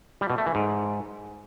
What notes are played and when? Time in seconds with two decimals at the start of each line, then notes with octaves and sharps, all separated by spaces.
0.21 G3
0.30 B2
0.38 A3
0.46 E3
0.55 G#2